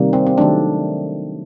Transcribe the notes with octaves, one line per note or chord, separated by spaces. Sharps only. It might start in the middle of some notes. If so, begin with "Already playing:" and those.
Already playing: C3 D#3 G3 A#3
C4
C4
D#3 F#3 A3 D4